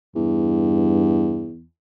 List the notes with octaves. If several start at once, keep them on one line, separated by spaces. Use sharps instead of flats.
E2 G2